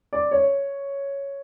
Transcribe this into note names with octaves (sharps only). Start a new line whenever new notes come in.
D5
C#5